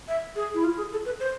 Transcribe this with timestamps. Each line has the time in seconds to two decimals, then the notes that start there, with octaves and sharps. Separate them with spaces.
0.08 E5
0.35 G#4
0.54 E4
0.64 F4
0.77 G#4
0.92 A4
1.05 B4
1.20 C5